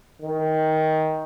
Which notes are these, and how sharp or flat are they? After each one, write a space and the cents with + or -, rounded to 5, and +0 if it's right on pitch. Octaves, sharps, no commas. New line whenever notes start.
D#3 +15